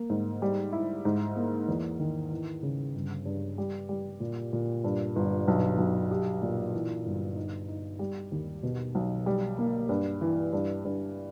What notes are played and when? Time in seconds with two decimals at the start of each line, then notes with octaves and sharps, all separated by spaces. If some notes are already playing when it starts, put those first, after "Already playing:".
Already playing: A#3
0.10 G#2
0.42 G3
0.72 E4
1.05 G#2
1.36 A#3
1.68 E2
1.99 D#3
2.31 E3
2.63 C#3
2.95 G1
3.25 G2
3.58 G3
3.89 G3
4.20 A#2
4.53 A#2
4.84 G2
5.16 G1
5.48 B1
5.78 B1
6.11 G4
6.42 A#2
6.73 E3
7.06 G1
7.36 D#4
7.68 D#4
7.99 G3
8.31 D#2
8.63 B2
8.95 B1
9.26 G3
9.58 A#3
9.89 G2
10.21 E3
10.53 G2
10.85 G2